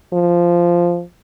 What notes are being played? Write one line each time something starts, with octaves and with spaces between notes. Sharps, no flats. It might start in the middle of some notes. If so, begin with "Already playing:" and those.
F3